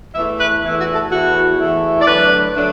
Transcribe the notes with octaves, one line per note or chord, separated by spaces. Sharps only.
E2 E3 A3 E4 E5
B4
E2 E3 A3 E4
F#4
A4
E2 E3 A3 E4 F#4
E2 E3 A3 E4
D5
D3 F#3 A3 D4 B4
D3 F#3 A3 D4